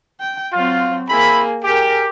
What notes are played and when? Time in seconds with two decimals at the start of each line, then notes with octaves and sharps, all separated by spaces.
0.20 G5
0.53 F#3 C4 F4
1.09 A#3 C4 E4 G#4 B5
1.63 G4 G#4 A#4